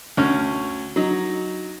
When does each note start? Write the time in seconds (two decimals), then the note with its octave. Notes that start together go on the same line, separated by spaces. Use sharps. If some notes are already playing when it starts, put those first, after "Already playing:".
0.17 D2 C#4 F6
0.96 F#3 D#4